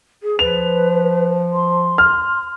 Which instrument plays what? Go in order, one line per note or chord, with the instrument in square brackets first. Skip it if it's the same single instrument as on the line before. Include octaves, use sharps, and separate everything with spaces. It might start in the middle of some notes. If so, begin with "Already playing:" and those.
[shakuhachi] G#4
[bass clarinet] F3 [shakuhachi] B4 [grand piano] F7
[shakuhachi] C6
[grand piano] F6